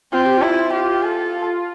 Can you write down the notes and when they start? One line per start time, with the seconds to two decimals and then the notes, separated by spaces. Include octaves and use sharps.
0.12 C4 F4
0.25 G4
0.37 E4 F4
0.73 G4
1.03 A4